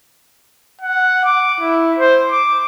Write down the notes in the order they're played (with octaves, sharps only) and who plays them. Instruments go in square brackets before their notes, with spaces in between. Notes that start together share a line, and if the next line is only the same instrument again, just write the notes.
[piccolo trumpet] F#5
D6
E4
C5
D6